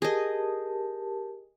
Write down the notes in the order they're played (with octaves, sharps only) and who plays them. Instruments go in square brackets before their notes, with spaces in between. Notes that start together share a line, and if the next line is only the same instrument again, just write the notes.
[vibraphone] G4 A#4 A5 [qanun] G#4 D#5